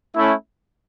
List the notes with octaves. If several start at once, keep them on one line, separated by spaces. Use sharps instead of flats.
A3 C#4 E4